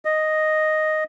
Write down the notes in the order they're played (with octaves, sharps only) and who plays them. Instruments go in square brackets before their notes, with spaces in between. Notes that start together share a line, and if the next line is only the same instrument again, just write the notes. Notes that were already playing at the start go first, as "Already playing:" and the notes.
[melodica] D#5